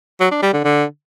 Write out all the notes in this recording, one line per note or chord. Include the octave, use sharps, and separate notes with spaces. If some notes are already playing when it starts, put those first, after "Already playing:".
F#3
D4
G3
D3
D3